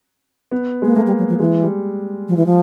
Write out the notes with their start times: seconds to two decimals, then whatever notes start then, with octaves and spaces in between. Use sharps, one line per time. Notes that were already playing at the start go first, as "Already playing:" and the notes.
0.51 B3
0.82 G#3 A#3
0.96 A3 A#3
1.07 G3
1.18 F#3
1.29 F3
1.39 E3 G#3
1.62 G3
2.28 F3
2.37 E3
2.46 F3